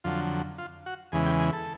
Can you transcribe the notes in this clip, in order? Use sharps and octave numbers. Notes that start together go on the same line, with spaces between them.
F2 D3 F#3 F4
F4
F#4
E2 C#3 E3 G#3 G#4
G4
G#4
A4